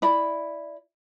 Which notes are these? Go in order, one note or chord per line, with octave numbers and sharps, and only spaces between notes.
E4 D5 B5